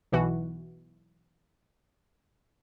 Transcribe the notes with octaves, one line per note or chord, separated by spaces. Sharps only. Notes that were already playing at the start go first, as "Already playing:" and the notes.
B1 B2 E3 F#4